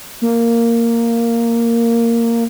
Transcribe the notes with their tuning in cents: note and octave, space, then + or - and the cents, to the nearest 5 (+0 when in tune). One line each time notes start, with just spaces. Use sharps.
A#3 -10